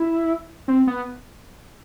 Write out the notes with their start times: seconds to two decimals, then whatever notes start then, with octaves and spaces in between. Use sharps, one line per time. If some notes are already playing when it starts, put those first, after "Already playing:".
Already playing: E4
0.68 C4
0.87 B3